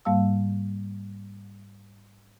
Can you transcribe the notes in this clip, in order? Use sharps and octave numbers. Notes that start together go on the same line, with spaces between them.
G#2 G3 A#3 F5 A5 E6